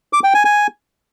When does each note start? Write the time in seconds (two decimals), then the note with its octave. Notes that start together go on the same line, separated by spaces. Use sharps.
0.13 D6
0.24 G5
0.34 G#5
0.45 G#5